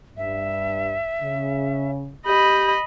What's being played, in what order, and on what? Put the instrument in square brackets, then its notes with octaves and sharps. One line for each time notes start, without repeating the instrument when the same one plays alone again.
[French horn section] G2 [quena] E5
[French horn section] C#3
[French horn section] G4 [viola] D#5 B5 [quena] G6